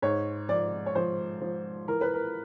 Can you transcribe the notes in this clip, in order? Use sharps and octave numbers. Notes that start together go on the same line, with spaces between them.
G#2 C#5
F3 D5
C#5
F3 C5
F3
E3 A#4
B4
A#4